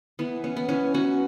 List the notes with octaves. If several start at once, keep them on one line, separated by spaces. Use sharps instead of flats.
E3 B3
B3 C#4
B3
E3 C#4
B3 C#4 F#4